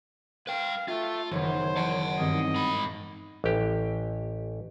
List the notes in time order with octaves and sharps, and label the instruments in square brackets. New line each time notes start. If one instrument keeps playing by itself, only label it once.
[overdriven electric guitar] B4 G5 [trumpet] F5
[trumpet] A3 [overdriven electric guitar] F4 [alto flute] E5
[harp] F#1 D#3 B3 [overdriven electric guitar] E3 [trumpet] C5 [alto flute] C#5
[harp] E3 F#4 [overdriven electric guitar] F#5 A5
[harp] G2 D#3 G3 [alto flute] C4 [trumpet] D#5
[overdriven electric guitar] G#2 B5
[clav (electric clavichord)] A1 G4